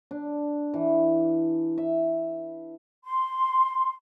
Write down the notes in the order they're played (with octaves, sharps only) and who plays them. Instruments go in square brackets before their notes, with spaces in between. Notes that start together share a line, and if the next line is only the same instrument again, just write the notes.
[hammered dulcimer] D4
E3
E5
[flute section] C6